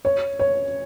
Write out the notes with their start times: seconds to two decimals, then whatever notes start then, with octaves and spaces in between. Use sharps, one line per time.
0.05 C#5
0.39 C#5